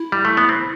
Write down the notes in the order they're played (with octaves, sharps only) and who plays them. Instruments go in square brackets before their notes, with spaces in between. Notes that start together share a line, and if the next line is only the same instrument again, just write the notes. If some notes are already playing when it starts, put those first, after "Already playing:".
Already playing: [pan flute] E4
[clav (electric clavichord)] G3
A3
B3
C4